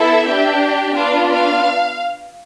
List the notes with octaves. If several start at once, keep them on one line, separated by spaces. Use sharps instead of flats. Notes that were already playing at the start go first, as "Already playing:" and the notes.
Already playing: B3 E4 A4 E5
D4 G4
B3 D4 F4 F5
F5